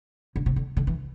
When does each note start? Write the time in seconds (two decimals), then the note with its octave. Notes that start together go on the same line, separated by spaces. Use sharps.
0.36 D3
0.46 C3
0.56 D3
0.77 D3
0.87 E3